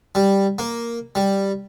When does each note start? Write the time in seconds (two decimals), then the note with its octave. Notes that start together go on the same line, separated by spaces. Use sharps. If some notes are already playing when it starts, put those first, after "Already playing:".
0.15 G3
0.59 A#3
1.15 G3